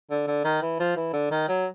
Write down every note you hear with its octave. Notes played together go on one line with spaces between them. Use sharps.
D3
D3
D#3
E3
F3
E3
D3
D#3
F#3